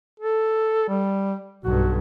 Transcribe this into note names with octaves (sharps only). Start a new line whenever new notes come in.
A4
G3
B1 G2 F#4